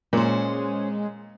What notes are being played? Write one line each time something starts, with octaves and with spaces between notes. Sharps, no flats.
A#2 G#3 C#4 C5